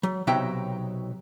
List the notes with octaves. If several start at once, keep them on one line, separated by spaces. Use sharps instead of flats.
F#3
B1 C3 F#3 D#4 E5 G5